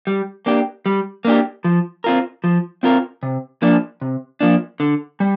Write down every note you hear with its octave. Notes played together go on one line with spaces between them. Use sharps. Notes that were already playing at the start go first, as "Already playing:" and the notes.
G3
A#3 D4 G4
G3
A#3 D4 G4
F3
C4 F4 A#4
F3
C4 F4 A#4
C3
F3 A#3 D4
C3
F3 A#3 D4
D3
G3